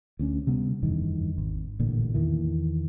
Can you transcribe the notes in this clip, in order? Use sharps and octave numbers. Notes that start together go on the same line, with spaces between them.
D2 C#4
C3 G3 B3
F#1 E2 G2 D#3
G#1
A1 A#2 D3
E2 D#3 E3